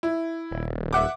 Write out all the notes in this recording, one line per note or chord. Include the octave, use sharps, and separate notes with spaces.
E4
D#1
E5 F#5 D6